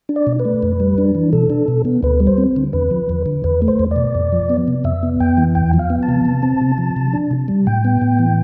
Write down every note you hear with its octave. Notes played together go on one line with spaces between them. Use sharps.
D4
D5
B2
B4
A3
F2
G3
D4
E3
B2 A4
D4
B2
B3
D2 B4
G3
C5
C4
D3
E2 B4
F3
E2
D3
E2 B4
A3
C5
E2
B2 D5
F2
F3
B3
C3
F2 E5
B3
F2 G5
E3
E2 G5
F3
F5
B3
A5
C3
C3
C4
C3
F3
C3
D4
C3
G3
A2 G5
B3
A2
E3